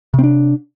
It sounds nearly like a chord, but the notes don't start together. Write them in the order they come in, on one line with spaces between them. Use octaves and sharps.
C3 C4 D4